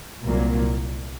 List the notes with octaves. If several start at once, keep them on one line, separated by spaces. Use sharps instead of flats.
C2 A#2 F#3 A#3